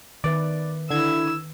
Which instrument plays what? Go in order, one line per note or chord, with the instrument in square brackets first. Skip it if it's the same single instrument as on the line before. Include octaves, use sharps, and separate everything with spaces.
[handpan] D#3 B4 E5 [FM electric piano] D5
[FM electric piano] D3 G#6 [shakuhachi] E4 [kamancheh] E6